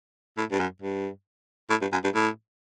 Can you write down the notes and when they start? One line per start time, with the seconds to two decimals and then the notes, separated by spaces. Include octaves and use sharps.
0.37 A2
0.51 G2
0.60 F#2
0.82 G2
1.70 A2
1.81 G2
1.92 F#2
2.04 G2
2.14 A2